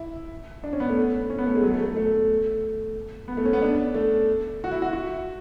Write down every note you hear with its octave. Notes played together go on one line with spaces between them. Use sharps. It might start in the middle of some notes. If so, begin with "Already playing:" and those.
Already playing: E4
D4
C#4
B3
A3
C#4
B3
A3
G#3
F#3
A3
A3
A3
B3
A3
C#4
B3
D4
A3
F#4
E4
F#4
F#4